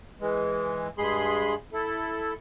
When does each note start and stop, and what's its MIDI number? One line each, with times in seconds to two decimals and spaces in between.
0.21 0.88 52
0.21 0.88 56
0.98 1.55 43
0.98 1.55 56
0.98 1.55 68
0.98 1.55 83
0.98 1.55 84
1.73 2.34 64
1.73 2.34 69